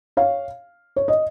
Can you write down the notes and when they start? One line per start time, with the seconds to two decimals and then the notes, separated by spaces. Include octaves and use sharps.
0.17 C#5 F5
0.96 C#5
1.08 D#5